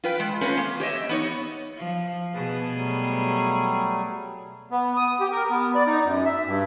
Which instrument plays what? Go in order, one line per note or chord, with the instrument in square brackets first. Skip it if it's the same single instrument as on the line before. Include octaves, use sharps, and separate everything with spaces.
[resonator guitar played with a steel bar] F4 B4 G5
G#3
A3 C4 C#4 F4 B4
A#3
G4 C#5 D#5 E5
B3 D#4 C#5
[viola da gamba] F3
[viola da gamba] B2 G#4 [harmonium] B4 A5
[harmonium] F#3 G3 A3
[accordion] B3
D#6
G4
A#4
B3
D5
D#4
F#2
E5
G2